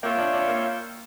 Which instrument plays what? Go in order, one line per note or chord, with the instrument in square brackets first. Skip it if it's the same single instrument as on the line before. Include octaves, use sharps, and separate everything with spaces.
[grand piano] A#3 [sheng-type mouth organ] F4 C#5 E5 G5
[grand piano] D4
D4
A#3